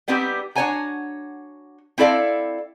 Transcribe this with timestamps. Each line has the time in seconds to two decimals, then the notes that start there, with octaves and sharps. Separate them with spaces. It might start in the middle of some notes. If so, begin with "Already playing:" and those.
0.08 G3 B3 C4 D#4 G4
0.55 D4 F#4 C#5 F#5 G#5 A#5
1.98 C4 E4 A4 D5 F5